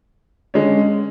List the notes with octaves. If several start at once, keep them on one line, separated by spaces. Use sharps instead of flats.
D3 G#3 C#4